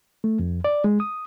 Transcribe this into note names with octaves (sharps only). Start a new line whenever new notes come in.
A3
F2
D5
G#3
D#6